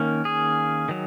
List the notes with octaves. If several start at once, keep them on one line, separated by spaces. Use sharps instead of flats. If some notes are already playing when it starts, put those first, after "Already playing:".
Already playing: D#3 A#3 C#4
G#4
D#3 F#3